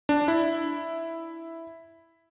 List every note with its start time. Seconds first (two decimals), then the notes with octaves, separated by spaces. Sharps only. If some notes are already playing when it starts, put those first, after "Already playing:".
0.09 D4
0.28 E4